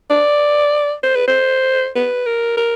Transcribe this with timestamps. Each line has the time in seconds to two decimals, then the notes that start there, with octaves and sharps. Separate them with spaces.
0.10 D5
1.03 C5
1.16 B4
1.28 C5
1.96 B4
2.26 A#4
2.57 A#4